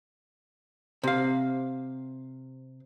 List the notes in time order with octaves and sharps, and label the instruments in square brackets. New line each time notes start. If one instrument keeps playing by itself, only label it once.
[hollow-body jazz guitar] C3 F5